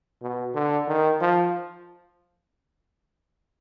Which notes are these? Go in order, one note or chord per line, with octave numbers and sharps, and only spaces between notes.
B2
D3
D#3
F3